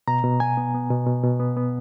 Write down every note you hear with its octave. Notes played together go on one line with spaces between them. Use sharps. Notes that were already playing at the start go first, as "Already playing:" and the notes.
B2 A#5
B2
B2 G#5
B3
B3
B2
B2
B2
B3
B3